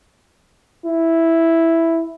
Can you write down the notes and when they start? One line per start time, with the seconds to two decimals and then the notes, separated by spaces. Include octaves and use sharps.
0.86 E4